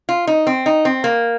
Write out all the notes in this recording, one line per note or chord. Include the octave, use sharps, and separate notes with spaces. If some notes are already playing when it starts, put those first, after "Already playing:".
F4
D#4
C4
D#4
C4
A#3